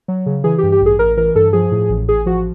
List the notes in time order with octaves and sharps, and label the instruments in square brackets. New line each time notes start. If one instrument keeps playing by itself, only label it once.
[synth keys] F#3
C#3
E3 G#4
G4
G2
G4
A1 G#4
A1 A#4
E3 A#4
G2 A4
F3 G#4
A2
A1
A1 G#4
F3 F#4